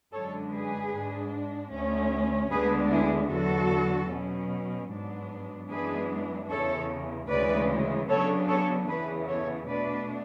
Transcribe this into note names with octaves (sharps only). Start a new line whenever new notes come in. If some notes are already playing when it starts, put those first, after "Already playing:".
F#2 D3 G#3 D4 A4 C#5
G#4 B4
G#2 G#3 D4
D2 D3 A3 C#4
D2 D3 G#3 B3 D4 G#4 B4
E4 G#4
E2 D3 F#3 F#4 A4
B2 F#3 C#4
G#2 F#3 B3 D4
F#2 E3 G#3 B3 D4 G#4 B4
E2 C#3 E3 A4 C#5
D2 C#3 E3 G#3 B4 D5
C#3 F#3 B3 D4 A4 C#5
A4 C#5
E2 C#3 E3 B3 G#4 B4
A4 C#5
B2 A3 D4 B4 D5